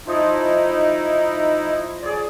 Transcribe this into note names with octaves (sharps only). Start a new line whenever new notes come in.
F3 D#4 E4 C#6 D#6
G#4 C#5 D5